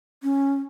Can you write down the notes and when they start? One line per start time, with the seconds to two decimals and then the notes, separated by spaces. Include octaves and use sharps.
0.23 C#4